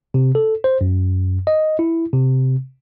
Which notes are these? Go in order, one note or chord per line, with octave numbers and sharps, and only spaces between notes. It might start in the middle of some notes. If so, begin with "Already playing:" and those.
C3
A4
C5
F#2
D#5
E4
C3